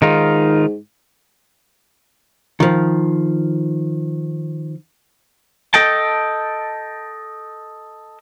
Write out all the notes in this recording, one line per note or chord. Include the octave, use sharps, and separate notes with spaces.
G#2 D#3 D#4 F4
D#3 F3
A4 D#5 G5 A5